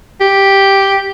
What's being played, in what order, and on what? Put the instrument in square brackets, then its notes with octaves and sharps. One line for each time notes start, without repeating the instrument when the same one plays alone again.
[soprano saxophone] G4